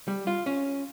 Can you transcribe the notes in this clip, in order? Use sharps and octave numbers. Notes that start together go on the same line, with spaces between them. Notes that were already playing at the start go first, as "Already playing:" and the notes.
G3
F4
C#4